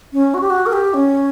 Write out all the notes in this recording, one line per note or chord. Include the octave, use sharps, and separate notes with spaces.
C#4
F#4
G4
F#4
A#4
G4
C#4